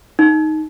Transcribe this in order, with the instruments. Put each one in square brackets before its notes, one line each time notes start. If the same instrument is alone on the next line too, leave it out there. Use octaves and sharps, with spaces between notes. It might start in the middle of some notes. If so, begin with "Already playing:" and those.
[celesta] D#4